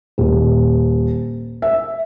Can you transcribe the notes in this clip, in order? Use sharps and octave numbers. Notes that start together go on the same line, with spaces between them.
D#1
E5